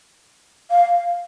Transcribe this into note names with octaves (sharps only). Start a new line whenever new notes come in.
F5